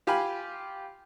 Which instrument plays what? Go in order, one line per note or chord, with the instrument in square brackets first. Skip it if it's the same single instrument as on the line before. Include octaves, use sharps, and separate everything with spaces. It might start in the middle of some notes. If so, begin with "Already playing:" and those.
[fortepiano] F4 G4 F5 G#5 B5